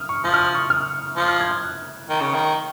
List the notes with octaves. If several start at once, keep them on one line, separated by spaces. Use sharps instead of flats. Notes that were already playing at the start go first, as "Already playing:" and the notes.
Already playing: D#6 F6
C#6
F3 D#6
F6
D#6
C#6
F6
F3 D#6
F6
G#6
G#6
F#6
D#3
C#3
D#3